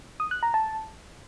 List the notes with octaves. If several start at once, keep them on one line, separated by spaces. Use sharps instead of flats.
D#6
F#6
A#5
A5